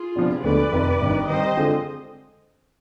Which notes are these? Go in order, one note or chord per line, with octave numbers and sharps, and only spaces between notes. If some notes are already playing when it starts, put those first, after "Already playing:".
Already playing: F4 G#4
C3 F3 B3 D4
D2 D3 G#3 B3 B4 D5
F1 F2 C3 D#3
G#1 G2 D#3
D#3 G3 C4 C5 D#5
D3 G#3 C4 F4 G#4